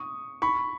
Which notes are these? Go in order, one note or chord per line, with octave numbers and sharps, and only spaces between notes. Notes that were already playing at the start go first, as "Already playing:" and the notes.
Already playing: C#6 D#6
B5 C#6